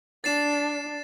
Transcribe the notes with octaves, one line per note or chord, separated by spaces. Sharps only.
D4 A6 C7 E7